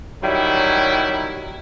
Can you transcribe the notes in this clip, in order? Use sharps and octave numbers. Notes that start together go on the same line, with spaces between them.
D#3 F#3 G3 C#4 E4